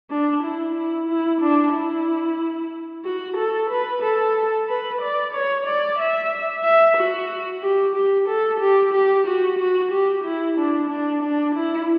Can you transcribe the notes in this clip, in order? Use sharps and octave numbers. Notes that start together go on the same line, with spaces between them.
D4
E4
E4
E4
D4
E4
F#4
A4
B4
A4
B4
D5
C#5
D5
E5
E5
F#4
G4
G4
A4
G4
G4
F#4
F#4
G4
E4
D4
D4
D4
E4